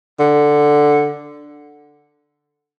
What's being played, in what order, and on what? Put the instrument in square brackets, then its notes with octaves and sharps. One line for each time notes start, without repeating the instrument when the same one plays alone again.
[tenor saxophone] D3